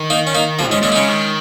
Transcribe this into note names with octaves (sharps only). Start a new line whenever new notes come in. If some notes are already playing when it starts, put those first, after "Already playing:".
Already playing: D#3
A#3 D#4
C#4
A#3 D#4
F3 A#3
G#2 G#3 C#4
A#2 G#3 C#4
D#4
C#3 G#3 C#4
D#3